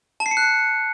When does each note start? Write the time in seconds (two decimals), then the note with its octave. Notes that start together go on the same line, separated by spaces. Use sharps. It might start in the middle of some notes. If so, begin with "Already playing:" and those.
0.20 A5
0.26 C7
0.31 C#7
0.37 F#6
0.42 C#7